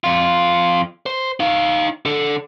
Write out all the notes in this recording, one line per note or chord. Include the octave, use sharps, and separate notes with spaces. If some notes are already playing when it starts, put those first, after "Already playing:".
F2 F4
C5
D#4 F5
D3 A4